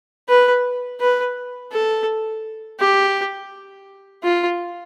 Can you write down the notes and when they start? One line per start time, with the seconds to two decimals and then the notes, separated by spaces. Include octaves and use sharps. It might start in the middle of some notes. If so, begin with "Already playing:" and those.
0.28 B4
1.00 B4
1.72 A4
2.80 G4
4.24 F4